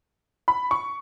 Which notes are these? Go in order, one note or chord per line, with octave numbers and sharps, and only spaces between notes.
B5
C#6